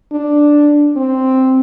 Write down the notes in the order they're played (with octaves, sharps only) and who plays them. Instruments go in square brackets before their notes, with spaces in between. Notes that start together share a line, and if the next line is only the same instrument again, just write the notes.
[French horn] D4
C4